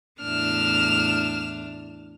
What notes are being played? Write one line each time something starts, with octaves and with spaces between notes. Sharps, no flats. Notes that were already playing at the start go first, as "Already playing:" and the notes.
E2 A2 D4 F6 E7